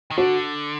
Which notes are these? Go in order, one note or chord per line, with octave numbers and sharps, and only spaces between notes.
D#3
D3 F#4